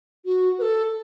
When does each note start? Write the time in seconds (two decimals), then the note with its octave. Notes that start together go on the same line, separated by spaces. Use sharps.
0.25 F#4
0.58 B4
0.62 A4